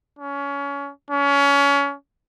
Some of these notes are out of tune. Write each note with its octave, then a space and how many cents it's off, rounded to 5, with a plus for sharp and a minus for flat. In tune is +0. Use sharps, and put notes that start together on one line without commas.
C#4 +25
C#4 +25